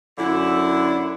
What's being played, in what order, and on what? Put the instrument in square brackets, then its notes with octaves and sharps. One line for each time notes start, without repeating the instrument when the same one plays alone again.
[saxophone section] F#2 D3 E4